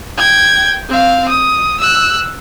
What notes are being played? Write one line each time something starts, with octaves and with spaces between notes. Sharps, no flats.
G5 G#6
C4 F5
D#6
E6 F#6